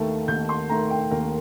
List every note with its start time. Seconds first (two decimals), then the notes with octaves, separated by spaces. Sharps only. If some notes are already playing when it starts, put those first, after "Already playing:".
Already playing: D#2 D#3 A3 A5
0.28 D#2 G6
0.49 C6
0.70 D#3 A3 A#5
0.90 G5
1.11 D#2 A#4